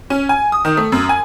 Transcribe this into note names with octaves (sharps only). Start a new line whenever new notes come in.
C#4
G#5
D#6
D#3
A3
F#2
G#5